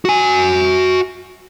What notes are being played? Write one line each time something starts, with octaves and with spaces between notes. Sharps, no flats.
F#4 G#5